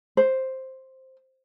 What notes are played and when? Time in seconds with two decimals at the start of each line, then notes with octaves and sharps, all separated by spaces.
0.17 C5